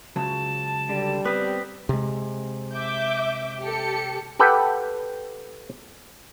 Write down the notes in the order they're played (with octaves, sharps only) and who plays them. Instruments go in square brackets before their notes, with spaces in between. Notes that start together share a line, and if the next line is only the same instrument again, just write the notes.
[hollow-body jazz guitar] C#2 C#3 F#3 [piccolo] A5
[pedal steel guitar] D3 [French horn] G3
[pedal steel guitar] B3 C4 [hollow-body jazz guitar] B4 [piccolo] B6
[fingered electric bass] C3 G#3
[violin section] E5 D6 G6
G4 A4 C#7
[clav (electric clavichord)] G4 A4 B4 F#5 G5